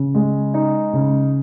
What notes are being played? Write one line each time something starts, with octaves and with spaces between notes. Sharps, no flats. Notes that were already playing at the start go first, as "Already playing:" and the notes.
Already playing: C#3
G#3
D#4
C#3